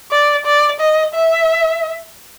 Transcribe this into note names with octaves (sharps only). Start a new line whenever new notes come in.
D5
D5
D#5
E5